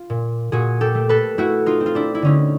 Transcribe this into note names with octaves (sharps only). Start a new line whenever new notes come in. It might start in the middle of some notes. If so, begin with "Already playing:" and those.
Already playing: F4
A#2
A#2 F#4 G#4
G4 A4
A3
A4 B4
A3 E4 F#4
D#4 F4
C4
F4
D4 E4
E4
D3 C#4 D#4